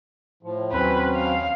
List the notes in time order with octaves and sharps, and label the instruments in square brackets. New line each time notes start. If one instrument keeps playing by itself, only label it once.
[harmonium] A2 F3
[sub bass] D#2 [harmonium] F#3 C4 C#4 [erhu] B4
[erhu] F5